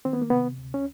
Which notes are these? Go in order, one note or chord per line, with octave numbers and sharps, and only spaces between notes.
D#3 C4
B3
A#3
C3 B3
D2
C#4